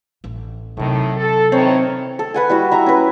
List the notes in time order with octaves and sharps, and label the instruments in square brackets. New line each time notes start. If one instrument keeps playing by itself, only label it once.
[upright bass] A1
[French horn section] A2 D#3 [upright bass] C3 F#3
[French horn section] A4
[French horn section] D#3 E3 C#5 [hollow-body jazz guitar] C4
[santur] A4
B4 F#5 G#5
G3 E4 F#4
E5 A#5
C#4 B4